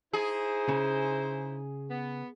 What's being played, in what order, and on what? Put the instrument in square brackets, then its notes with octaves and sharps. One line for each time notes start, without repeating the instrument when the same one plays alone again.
[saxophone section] D#4 E4 C5 [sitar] G#4
[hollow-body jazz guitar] C#3
[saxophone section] B3